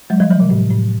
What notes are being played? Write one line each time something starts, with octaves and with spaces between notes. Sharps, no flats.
F#3 G#3
F3 G3
E3 F#3
C3
A2
A2